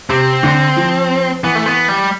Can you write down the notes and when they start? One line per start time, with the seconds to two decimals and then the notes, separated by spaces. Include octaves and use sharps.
0.10 C3 C4
0.43 D3
0.76 F3
1.43 E3 B3
1.55 A3
1.66 B3
1.88 G3